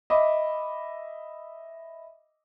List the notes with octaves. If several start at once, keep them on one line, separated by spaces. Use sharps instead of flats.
D#5 E5 B5 D6